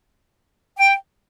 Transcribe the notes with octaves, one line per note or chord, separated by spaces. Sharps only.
G5